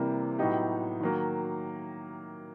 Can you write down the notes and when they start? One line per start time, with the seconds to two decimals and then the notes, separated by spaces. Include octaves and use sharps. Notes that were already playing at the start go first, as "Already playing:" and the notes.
Already playing: C3 E3 G3 A#3
0.38 A2 F#3 B3 D#4 G4
1.00 D#3 F#3 A#3